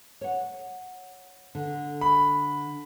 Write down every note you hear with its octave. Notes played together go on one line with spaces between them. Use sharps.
C#5 F#5
D3
B5